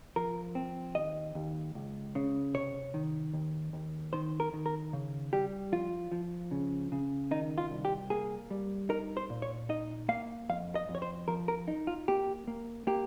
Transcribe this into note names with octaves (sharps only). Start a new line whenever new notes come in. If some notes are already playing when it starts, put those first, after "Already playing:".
F3 A#4
C4
D#2 D#5
D#2
C#2
C#3
C3 C#5
D#3
D#2
D#2
D#3 C5
A#4
D#3
A#4
C#3
G3 G4
F3 F4
F3
C#3
C#3
D#3 D#4
F4
C2
G4
A#3 G#4
G3
D#4 A#4
C5
A#2
C#5
D#4 D#5
A#3 F5
F2 F5
D#5
F2
C#5
C5
F3 A#4
A#4
D#4
F4
A#3 G4
A#3
A#3 G4